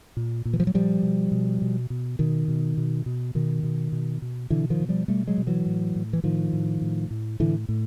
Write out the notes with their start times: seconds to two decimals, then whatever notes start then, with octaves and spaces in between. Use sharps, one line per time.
0.17 A#2
0.45 A#2
0.53 E3
0.60 F3
0.67 F#3
0.74 A#2 F3 G3
1.03 B2
1.32 B2
1.62 B2
1.90 B2
2.19 B2 D#3
2.48 B2
2.77 B2
3.06 B2
3.35 B2 D#3
3.63 B2
3.92 B2
4.22 B2
4.50 B2 D3 E3
4.70 D#3 F3
4.80 B2
4.89 F3 G3
5.08 B2 G3 A3
5.27 F#3 G#3
5.38 B2
5.47 E3 F#3
5.66 A2
5.96 A2
6.13 E3
6.24 A2 D#3 F3
6.53 A2
6.82 A2
7.11 A2
7.40 A2 D3 E3
7.69 A2